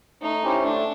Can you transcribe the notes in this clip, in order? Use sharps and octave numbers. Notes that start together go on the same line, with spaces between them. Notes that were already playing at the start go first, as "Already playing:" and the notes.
A3 D#4
C#4 E4 G4 C5
A3 D4